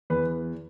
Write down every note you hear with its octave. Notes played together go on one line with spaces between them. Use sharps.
E2 B4